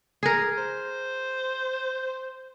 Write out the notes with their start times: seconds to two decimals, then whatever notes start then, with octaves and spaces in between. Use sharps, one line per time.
0.23 G#4 A#4
0.58 C5